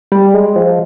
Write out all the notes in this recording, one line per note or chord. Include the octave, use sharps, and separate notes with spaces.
G3
G#3
F3